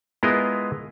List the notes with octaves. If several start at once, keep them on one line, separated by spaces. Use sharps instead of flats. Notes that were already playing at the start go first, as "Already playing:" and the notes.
G#3 B3 E4 F4 A#4 D#5